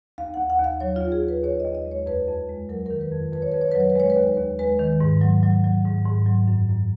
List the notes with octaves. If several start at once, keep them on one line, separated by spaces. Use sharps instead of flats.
D#2 F5
D#2 F#5
F#5
D#2
F5
F#3 C#5
D#2 F4
G#4
D#2
B4
D#2 C#5
D#5
D#2
D#5
G#3
C#5
F2 B4
F2
G#3
F#3 A#4
D#3 A#4
B4
F2
F2 B4
C#5
F2 B4
C#5
F#3 B4
C#5
B4
G#3 C#5
B4
D#2
D#2
G#3 B4
D#3
G#2
F#3
F#3
F#3
G#2
G#2
F#3
F#2
F#2